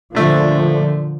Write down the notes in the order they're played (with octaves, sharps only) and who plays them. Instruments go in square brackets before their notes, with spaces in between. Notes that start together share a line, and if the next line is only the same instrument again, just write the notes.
[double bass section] A#2 D3 F3 [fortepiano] A3 D4